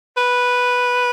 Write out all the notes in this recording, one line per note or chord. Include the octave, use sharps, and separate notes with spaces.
B4